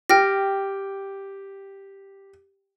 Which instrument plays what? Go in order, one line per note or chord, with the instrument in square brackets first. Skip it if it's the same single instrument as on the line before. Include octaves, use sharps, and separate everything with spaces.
[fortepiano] G4 [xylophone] G5 F6 A#6